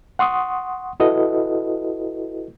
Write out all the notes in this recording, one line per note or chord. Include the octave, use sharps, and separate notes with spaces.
F#5 C6 C#6 D#6
E4 F#4 A4 B4 D#5